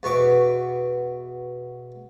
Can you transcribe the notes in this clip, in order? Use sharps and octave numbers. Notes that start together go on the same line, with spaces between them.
E2 B2 C#6 D6